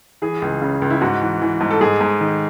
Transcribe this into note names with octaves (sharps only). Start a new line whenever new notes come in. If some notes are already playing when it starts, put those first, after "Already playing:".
E3 G#4
C#2
C#3
C#2
E4
G#2 F#4
E3
E3
G#2
A4
G#2 G#4
G#2
D#3